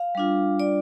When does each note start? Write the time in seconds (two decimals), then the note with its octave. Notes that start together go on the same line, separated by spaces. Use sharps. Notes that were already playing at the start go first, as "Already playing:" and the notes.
Already playing: F5
0.15 G3 D4 F4
0.60 D5